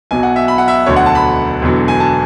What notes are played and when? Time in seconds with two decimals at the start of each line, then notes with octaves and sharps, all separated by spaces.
0.11 B1 B2 F#3 G#5
0.23 F#5
0.36 E5
0.48 B5
0.58 F#5
0.68 E5
0.86 E1 D2 D3 F#3 C#5
0.96 F#5
1.06 A5
1.15 B5
1.62 E1 E2 D3 F#3
1.88 G#5
2.00 A5